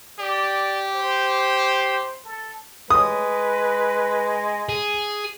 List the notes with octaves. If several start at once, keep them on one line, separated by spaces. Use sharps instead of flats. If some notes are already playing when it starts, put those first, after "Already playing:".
G4 D5
C5
A4
G#3 B4 D#6
G#4